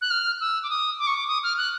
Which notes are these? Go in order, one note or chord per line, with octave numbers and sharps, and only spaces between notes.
F#6
F6
E6
D6
D#6
D6
C#6
D6
D#6
F6
F#6